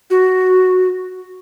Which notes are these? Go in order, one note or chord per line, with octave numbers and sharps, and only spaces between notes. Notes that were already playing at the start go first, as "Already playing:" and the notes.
F#4